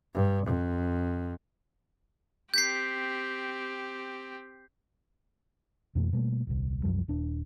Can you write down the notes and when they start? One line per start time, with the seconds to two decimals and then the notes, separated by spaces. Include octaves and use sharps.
0.15 G2
0.46 F2
2.54 C4 G4 G6 B6 C7
5.95 F2 B2 E3 A3
6.13 B2 G3 A3 A#3
6.47 D#1 C2
6.83 C2 F#2 F3 G3
7.08 D#1 D4